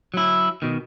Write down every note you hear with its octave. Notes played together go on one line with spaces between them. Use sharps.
F#3 E4
B2 D#3